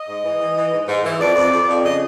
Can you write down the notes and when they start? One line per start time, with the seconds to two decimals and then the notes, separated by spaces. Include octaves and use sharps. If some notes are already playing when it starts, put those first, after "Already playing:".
Already playing: D#5
0.09 G#2
0.25 E3
0.41 E3
0.56 E3
0.73 G#2
0.88 G#2
1.04 E3
1.20 F2 D5
1.36 F2
1.53 F2
1.68 F2
1.84 C#3 D#5